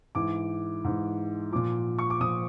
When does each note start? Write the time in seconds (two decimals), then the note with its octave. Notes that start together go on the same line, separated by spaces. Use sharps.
0.15 G#2 E3 D6
0.84 G#2 E3
1.52 A#2 F3 D6
1.99 C#6
2.10 D6
2.20 A#2 F3 D#6